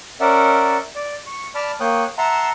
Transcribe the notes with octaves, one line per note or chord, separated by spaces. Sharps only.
C#4 A#4 D5 E5 F#5
D5
C#6
D5 A5 B5 F6
A#3 C#5 G5 D#6 F#6
E5 F#5 A5 A#5 C6